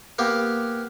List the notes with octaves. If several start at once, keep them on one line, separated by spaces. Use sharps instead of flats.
A#3 B3 G4